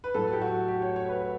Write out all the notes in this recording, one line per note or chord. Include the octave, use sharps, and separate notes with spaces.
B4
A2 F#3 A3 A4
G4
F#4
G4
C#5
C#5
B4